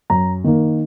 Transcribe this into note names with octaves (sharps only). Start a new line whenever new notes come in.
F#2 A#5
D#3 A#3